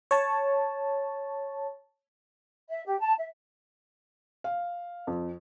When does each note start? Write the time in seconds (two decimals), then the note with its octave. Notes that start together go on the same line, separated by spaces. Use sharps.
0.11 C#5 A5
2.69 E5
2.85 G4
2.99 A5
3.17 E5
4.44 F5
5.07 F2